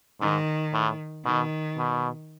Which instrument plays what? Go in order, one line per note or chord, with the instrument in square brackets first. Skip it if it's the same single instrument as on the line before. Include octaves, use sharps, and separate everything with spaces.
[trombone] G#2 [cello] D#3
[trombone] A2
[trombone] B2 [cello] D#3
[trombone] B2